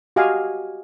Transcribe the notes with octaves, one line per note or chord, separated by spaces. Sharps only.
F#4 G4 D#5 F5 G#5